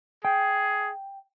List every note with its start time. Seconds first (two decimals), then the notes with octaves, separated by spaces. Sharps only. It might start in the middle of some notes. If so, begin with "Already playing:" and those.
0.25 G#4 G5